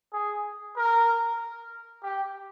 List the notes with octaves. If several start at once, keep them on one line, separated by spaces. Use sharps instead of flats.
G#4
A#4
G4